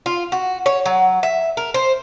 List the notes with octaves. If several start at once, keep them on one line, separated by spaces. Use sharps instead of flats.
F4
F#4
C#5
F#3
E5
A#4
C5